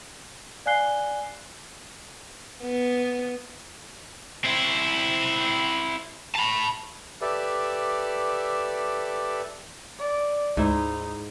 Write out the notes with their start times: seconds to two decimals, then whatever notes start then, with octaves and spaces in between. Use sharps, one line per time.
0.66 D5 F5 G#5 F#6 C7 G7
2.63 B3
4.44 C4 E4
6.36 A5 B5
7.21 G4 A4 B4 D5 E5
9.99 D5
10.57 D2 G#2 D#4 E4 C5